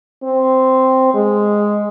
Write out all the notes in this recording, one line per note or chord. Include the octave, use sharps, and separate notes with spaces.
C4
G#3